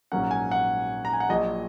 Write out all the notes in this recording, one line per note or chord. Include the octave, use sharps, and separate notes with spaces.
A#1 G#2 F#3 A#3 C#4 F#5
G#5
F#5
A#5
G#5
F#5
A#1 A#2 F#3 D#5